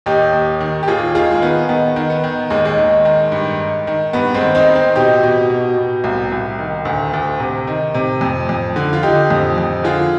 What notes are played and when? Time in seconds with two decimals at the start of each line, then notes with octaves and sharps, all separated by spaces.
0.06 D#2 D#4 G4
0.33 D#2
0.60 D#3
0.83 G4
0.88 D#2 F4 G#4
1.15 D#3 F4 G#4
1.31 G#3
1.42 D#3 B3
1.69 D#3 B3
1.96 D#3
2.10 B3
2.24 D#3
2.50 D#2 G#3
2.65 G#3
2.77 D#3
3.05 D#3
3.32 G2
3.60 D#3
3.87 D#3
4.13 G2 B3
4.34 G#3 C4
4.41 D#3
4.55 C4 D#4
4.68 D#3
4.75 C4 D#4
4.95 B2 D#4 G4
5.23 B2
5.50 B2
5.77 B2
6.04 C2
6.32 C2
6.58 D#3
6.85 D2
7.13 D2
7.40 C3
7.67 D#3
7.94 C3
8.21 F2
8.49 F2
8.76 D3
8.93 F4
9.03 D3 D#4 G4
9.30 F2
9.58 F2
9.84 D3 F4 G#4